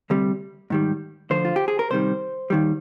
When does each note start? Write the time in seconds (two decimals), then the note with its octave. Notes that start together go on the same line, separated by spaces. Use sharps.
0.10 D2 C3 G3
0.70 G#2 D#3 G3
1.30 D2 D3 F3 C5
1.45 F4
1.56 G4
1.68 G#4
1.79 A#4
1.90 C2 C3 D#3 G3 C5
2.50 D#2 D#3 G3